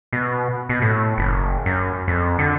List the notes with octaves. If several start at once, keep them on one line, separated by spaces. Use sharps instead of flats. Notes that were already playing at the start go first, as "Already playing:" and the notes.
B2
B2
A2
F#1
F#2
F2
D3